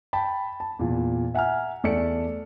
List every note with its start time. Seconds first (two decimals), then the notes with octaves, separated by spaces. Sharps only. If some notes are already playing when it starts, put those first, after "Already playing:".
0.13 G5 A5 B5
0.60 A5
0.79 E2 A#2
1.34 E5 F#5 G#5 A#5 F6
1.83 E2 A3 A4 D5 A5 C#7